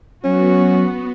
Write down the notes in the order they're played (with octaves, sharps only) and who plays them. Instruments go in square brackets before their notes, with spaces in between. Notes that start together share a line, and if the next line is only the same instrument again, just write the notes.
[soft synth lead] F#3 [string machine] B3 [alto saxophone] C#4 [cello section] F#4